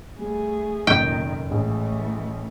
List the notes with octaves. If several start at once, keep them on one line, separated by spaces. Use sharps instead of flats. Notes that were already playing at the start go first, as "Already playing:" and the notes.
G3 A3 G#4
F1 F#2 A#2 D#3 D#4 G5
A1 E3 G#3 A3